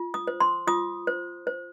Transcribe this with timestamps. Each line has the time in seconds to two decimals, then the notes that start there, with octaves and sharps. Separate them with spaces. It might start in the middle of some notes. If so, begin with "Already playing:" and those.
Already playing: F4
0.14 D#6
0.27 C5
0.40 C6
0.67 F4 D#6
1.07 C5
1.47 C5